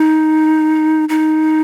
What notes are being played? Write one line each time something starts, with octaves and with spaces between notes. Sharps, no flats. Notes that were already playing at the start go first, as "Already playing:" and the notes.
Already playing: D#4
D#4